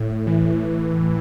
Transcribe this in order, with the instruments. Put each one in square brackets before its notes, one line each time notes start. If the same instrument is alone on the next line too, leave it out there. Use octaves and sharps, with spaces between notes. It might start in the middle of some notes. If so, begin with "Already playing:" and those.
Already playing: [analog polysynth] A2
E3
A2